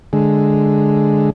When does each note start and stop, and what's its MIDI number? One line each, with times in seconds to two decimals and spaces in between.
0.13 1.30 50
0.13 1.30 56